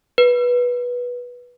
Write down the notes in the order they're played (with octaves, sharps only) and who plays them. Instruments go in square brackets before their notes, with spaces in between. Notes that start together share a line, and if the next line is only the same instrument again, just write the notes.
[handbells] B4